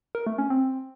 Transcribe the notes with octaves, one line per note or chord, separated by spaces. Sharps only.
A#4
A3
C#4
C4